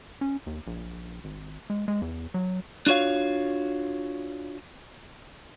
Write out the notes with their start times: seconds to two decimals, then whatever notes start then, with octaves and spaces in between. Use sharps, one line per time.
0.21 C#4
0.47 D#2
0.67 A#1
1.24 G#1
1.70 G#3
1.88 G#3
2.02 E2
2.34 F#3
2.86 D4 F4 F#4 C#5 F5